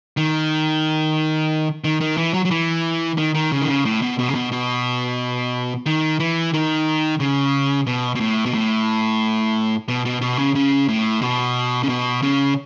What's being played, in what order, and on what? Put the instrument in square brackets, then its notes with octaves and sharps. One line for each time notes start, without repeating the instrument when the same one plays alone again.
[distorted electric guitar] D#3
D#3
D#3
E3
F#3
F#3
E3
D#3
D#3
C#3
D#3
C#3
A2
B2
B2
C#3
B2
B2
D#3
E3
D#3
C#3
B2
B2
A2
B2
A2
B2
B2
B2
C#3
C#3
A2
B2
C#3
B2
C#3